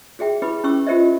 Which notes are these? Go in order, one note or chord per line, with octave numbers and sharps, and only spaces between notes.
F#4 G#4 E5 G5
E4 G4 B4 B5 D6
C#4 E4 G5 C#6 D6 E6
F4 G4 A#4 C5 D#5 E5